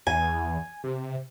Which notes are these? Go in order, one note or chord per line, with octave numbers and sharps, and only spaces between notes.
E2 G#5
C3